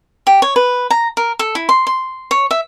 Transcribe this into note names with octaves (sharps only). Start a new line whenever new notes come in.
G4
C#5
B4
A#5
A#4
A4
E4
C6
C6
C#5
E5